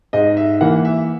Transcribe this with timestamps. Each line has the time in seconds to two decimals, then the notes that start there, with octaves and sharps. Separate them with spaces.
0.13 G#2 D#5
0.37 E5
0.61 E3 A#3 F#5
0.85 E5